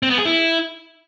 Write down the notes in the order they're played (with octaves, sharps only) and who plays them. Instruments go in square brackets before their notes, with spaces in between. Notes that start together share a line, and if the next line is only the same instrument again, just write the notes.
[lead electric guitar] C4
B3
G#4
E4